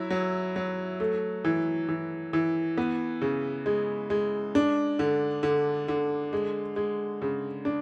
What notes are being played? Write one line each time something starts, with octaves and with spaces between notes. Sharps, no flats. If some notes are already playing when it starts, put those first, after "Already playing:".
Already playing: F#3 E4
F#3
F#3
A3
E3
E3
E3
B3
C#3
G#3
G#3
D4
D3
D3
D3
G#3
G#3
C#3
D4